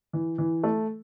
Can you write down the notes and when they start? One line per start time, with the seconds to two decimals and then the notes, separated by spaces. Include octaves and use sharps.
0.13 E3
0.38 E3
0.63 A3